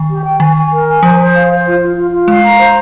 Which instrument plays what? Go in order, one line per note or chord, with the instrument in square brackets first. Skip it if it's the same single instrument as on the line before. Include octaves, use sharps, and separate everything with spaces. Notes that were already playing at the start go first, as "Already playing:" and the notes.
Already playing: [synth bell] D#3
[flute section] G4
G5
[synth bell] D#3 [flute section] G#5
[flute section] G#5
A#4
G#5
[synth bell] F3 [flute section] C5
[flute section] C5
F5
C5
F4
F4
F4
F4
[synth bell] G#3 [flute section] F5
[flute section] A#5
C5